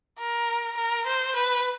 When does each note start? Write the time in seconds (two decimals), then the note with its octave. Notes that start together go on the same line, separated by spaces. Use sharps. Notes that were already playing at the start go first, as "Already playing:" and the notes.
0.19 A#4
0.77 A#4
1.07 C5
1.36 B4